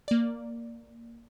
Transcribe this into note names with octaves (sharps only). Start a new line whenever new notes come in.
A#3 D5